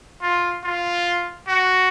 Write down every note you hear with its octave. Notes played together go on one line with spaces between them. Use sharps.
F4
F4
F#4